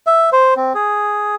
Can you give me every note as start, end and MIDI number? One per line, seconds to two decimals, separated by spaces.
0.07 0.30 76
0.32 0.54 72
0.56 0.73 60
0.75 1.35 68